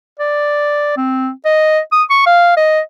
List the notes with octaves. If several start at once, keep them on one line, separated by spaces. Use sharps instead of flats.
D5
C4
D#5
D#6
C#6
F5
D#5